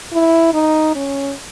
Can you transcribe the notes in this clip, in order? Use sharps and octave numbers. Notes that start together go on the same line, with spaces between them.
E4
D#4
C#4